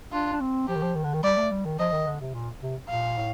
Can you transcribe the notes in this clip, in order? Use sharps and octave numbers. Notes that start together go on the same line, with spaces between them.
D4 F4
D4
C4
F3 G4
D#3
F3
D#3
D3
D#3
G3 D5
A3
G3
D#3
F3 D#5
D#3
D3
C3
A#2
C3
A#2 F5
A2